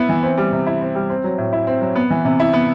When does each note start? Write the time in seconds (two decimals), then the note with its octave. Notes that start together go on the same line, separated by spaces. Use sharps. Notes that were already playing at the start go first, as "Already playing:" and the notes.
Already playing: B3 E4
0.09 E3
0.23 C4
0.38 G3
0.52 C3
0.67 E4
0.81 C4
0.95 G3
1.10 C4
1.24 F#3
1.38 A2
1.53 E4
1.67 C4
1.81 F#3
1.96 B3
2.10 E3
2.25 C3
2.40 E4
2.53 B3